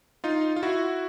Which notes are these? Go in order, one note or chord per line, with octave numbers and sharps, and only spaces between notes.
D#4 F4
F4
E4 F#4